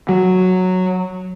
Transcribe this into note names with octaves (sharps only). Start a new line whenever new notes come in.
F#3